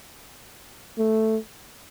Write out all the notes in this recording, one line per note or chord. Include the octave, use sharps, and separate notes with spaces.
A3